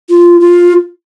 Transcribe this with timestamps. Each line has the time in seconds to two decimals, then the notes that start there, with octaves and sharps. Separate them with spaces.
0.10 F4
0.41 F4